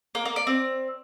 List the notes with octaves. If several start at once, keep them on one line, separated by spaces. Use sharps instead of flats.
A#3
A#3
D5
C4